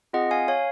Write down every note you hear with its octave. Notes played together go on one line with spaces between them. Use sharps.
C4 F4 G#4 D#5 F#5
F5 G#5
C#5 F5